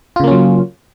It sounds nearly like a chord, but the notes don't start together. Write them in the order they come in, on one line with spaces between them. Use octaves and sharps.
F4 C#3 A#3 C#4 F#3